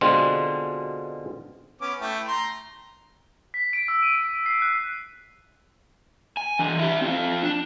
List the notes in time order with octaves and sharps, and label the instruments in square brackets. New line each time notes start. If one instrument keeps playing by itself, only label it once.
[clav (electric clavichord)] B2 D3 G#3 C4 F4
[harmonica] B3 C#4 D6
A3 E4 G5
A#5 C6
[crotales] B6
D7
E6
D#7
D7
C7
F#6
[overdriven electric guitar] G#5
E3 D4
E4 G4
C4 F4
D4